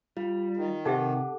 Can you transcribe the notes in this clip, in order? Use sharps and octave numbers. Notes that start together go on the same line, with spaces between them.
G3 F4
D#3
C3 D#4 G4 A4 E5 F#5 D6